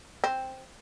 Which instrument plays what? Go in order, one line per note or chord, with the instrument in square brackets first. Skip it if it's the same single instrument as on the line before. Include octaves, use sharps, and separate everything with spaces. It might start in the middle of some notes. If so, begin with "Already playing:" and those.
[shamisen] C4